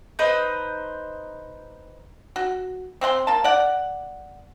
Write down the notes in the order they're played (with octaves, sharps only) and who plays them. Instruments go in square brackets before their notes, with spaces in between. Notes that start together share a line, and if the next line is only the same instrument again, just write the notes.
[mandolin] D#4 B4 C5
[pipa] F#4
C4 C5 F#5 C6
A#3 A5
D5 F#5